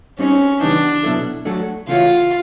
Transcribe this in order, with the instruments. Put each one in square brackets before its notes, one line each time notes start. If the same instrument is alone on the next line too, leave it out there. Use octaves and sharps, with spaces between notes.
[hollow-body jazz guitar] G3 C4 D#4 G#4 C#5 [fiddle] C#4
[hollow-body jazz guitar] C#3 E3 G3 B3 D#4 [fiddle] D4
[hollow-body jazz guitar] B2 F#3 B3 E4 A4
F#3 A3 D4 F#4 A4
[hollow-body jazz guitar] C#3 E3 A3 C#4 F#4 [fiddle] F4